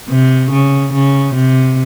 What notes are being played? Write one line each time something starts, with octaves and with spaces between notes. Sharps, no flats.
C3
C#3
C#3
C3